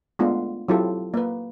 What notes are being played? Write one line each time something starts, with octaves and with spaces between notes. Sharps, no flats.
G#3 A3 B3 D4 F4
F#3 C4 E4 F4 G4 A4
A#3 B4